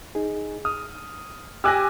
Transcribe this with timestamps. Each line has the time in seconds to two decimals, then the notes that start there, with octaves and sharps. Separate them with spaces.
0.15 D#4 G#4
0.65 D#6 F6
1.64 G4 G#5 D6 E6 F#6 A#6